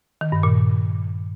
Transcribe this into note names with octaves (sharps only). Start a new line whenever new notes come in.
D#3
G2
A#2